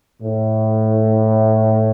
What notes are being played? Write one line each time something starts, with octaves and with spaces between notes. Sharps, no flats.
A2